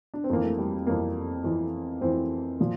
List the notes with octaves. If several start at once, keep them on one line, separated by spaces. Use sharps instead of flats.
D4
C4
F2 E3 A#3
A3
G3
F2 E3 A#3
F2 E3
F2 E3 C4
A#2 F3